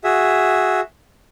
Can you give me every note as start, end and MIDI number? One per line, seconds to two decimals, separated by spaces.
0.04 0.80 66
0.04 0.80 68
0.04 0.80 76